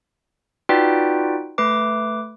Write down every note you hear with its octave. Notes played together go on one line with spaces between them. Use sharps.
D#4 F4 F#4 B4 D5 G5
A3 B4 D6